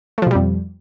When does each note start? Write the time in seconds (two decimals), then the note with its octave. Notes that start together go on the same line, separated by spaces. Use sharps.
0.18 A3
0.22 F3
0.27 B2
0.31 G3
0.35 F2